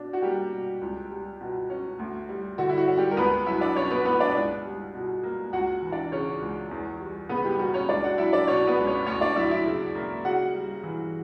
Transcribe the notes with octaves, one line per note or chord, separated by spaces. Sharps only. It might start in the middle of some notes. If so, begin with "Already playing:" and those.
Already playing: B2 D4
F#4
G3 A#3 G4
B2
C#2
G3
B2
C#4
D2
G3
D3 F#4
E4
F#4
C#4
G3 G4
A#4
C#2 B3 B4
F#3 E4 E5
D4 D5
B2 C#4 C#5
B3 B4
B3 B4
D4 D5
C#2
G3
B2
A#3
C#2 F#4 F#5
E3
D4 D5
C#3 C#4 C#5
C#2
E2
G3
C#3 B3 B4
G3 G4
A#3 F#4
C#4 C#5
C#2 D4 D5
F#4 F#5
F#3 E4 E5
D4 D5
B2 C#4 C#5
B3 B4
C#2
C#4 C#5
D2 C#4 C#5
D4 D5
F#3 E4 E5
E4 E5
C#3
A#3
C#3 F#4 F#5
G3
E3